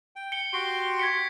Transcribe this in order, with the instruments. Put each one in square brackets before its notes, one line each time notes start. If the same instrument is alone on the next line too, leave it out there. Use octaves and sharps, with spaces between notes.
[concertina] G5
[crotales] C#7 G7
[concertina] F#4 G4 C6 [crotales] D7
[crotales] G#6 B6 C#7